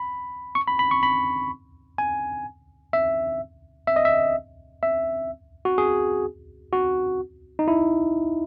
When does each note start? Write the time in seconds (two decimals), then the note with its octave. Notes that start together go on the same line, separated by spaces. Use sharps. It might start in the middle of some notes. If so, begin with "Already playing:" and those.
Already playing: B5
0.55 C#6
0.68 B5
0.79 B5
0.91 C#6
1.03 B5
1.98 G#5
2.93 E5
3.87 E5
3.96 D#5
4.05 E5
4.83 E5
5.65 F#4
5.78 G#4
6.73 F#4
7.59 D#4
7.68 E4